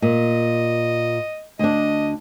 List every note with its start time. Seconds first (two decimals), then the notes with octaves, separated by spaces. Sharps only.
0.02 A#2 D#5
1.59 D2 D4 D#5